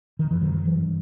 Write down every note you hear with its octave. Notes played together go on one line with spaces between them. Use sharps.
D#3
F#2 E3
D#3 F#3
D#3 F#3
E3
G2